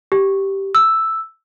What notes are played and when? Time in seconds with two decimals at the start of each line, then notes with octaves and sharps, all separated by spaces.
0.12 G4
0.75 E6